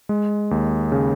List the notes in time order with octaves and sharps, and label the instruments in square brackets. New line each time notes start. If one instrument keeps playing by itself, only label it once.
[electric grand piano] G#3
D#2
C#3